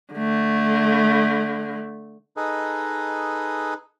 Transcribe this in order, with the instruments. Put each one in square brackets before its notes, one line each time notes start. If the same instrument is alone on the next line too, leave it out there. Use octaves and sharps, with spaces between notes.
[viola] D3 A3
[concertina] D#4 G#4 A4 B4 D#5